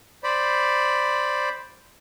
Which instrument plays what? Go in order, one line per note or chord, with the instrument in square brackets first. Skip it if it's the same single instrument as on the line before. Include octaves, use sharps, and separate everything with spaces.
[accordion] C5 D5 B5